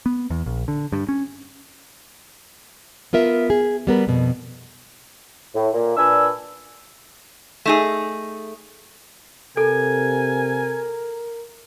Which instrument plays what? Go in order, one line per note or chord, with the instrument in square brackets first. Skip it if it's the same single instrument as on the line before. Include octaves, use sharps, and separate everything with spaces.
[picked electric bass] B3
E2
A#1
D3
G2
C#4
[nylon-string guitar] B3 F4 A#4 E5
G#4
G3 B3 A#4
F2 B2
[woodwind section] A2
A#2
A#2 D4 B4 G#5 E6
[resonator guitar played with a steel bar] A3 D#4 G#4
[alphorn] C3 [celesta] A4 [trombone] A#4 [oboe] G#5